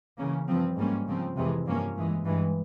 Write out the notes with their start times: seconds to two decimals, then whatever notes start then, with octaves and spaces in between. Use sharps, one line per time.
0.18 C#3 E3 A#3 C#4
0.48 G2 F3 C4
0.77 G#2 G3 A#3 C#4
1.07 C#3 F3 C4
1.37 F2 C3 E3 G#3
1.66 G2 F3 A#3 C#4
1.96 G2 E3 G#3
2.25 G2 E3 G#3